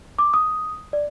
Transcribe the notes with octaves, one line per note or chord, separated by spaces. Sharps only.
D6
D#6
D5